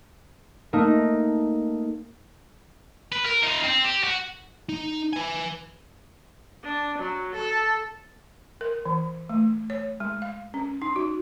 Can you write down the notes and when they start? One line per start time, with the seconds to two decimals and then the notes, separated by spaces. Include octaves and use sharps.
0.73 A3 A#3 D#4
3.12 B4
3.26 A#4
3.43 D#4 F4
3.64 C4
3.84 G4
4.03 F#4
4.69 D#4
5.13 B4 G#5
6.63 D4
6.98 F#3
7.35 A4
8.61 A#4
8.85 E3
9.29 A3
9.70 C#5
10.00 G#3
10.22 F5
10.54 C#4
10.82 D#4
10.96 F#4